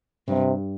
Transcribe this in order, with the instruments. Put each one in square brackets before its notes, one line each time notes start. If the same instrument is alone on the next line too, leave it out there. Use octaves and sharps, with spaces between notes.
[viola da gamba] G2 [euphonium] C3